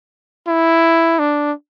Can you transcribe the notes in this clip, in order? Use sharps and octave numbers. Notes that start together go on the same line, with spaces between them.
E4
D4